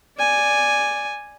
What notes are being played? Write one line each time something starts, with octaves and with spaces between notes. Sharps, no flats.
D5 G#5